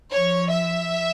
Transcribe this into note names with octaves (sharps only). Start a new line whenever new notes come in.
F3 C#5
E5